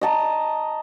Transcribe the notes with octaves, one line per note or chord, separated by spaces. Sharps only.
D#5 A5 A#5